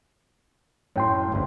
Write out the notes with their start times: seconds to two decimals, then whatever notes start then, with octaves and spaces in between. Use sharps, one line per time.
0.96 F#2 A2 C#5 G5 C6
1.32 G1 D2